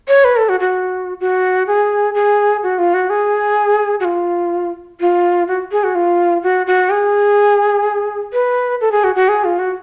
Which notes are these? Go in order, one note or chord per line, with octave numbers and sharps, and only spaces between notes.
C#5
B4
A4
F#4
F#4
F#4
G#4
G#4
F#4
F4
F#4
G#4
F#4
F4
F4
F#4
G#4
F#4
F4
F#4
F#4
G#4
B4
A4
G#4
F#4
F#4
G#4
F4
F#4